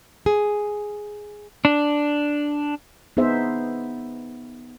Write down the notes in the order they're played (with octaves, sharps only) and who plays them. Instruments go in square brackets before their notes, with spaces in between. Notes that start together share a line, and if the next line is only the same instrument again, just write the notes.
[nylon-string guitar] G#4
[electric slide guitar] D4
[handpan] B3 D#4 G#4 C5 E5